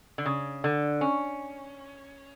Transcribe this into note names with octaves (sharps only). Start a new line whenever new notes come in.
D3
C#3
D3
C#4